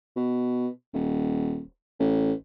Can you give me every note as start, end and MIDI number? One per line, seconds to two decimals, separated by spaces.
0.16 0.68 47
0.93 1.61 27
2.00 2.33 33